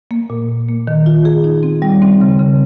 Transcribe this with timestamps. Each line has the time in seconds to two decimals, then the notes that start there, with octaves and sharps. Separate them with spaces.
0.11 A#3
0.30 A#2
0.49 A#2
0.69 A#3
0.87 D#3
1.06 F4
1.25 G#4
1.44 D#4
1.63 C4
1.82 G3
2.02 C4
2.21 C#3
2.40 C#3